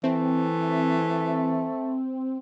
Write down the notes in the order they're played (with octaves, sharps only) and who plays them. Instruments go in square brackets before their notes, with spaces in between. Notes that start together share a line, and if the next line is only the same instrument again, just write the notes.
[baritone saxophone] E3 [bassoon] A3 [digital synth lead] C4